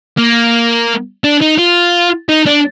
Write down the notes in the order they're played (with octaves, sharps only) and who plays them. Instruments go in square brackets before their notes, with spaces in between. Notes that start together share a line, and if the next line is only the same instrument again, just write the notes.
[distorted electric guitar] A#3
D4
D#4
F4
D#4
D4